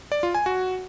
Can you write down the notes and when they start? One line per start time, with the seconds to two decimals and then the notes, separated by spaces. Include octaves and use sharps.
0.12 D5
0.23 F4
0.35 G#5
0.46 F#4